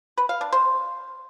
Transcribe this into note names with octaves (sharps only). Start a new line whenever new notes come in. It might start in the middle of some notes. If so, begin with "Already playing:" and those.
B4
F5
D4
C5